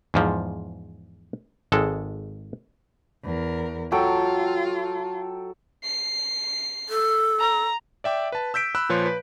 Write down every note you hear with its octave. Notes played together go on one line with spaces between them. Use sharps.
E2 G#2 F3
G#1 G#3 A4
E2 A#4
F#3 F4 A4 G5
C7
A4
A#5
D5 E5 G5 D6
B4 A5
E6 G6 B6 D7
B5 E6 F#6
A#2 F3 B4 C#5 C6
B4